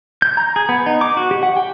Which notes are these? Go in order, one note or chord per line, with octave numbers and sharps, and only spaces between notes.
G6
A#5
G#4
B3
D#4
D6
F#4
G4
F#5
G5